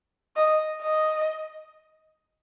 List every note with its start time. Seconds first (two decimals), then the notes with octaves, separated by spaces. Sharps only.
0.36 D#5
0.82 D#5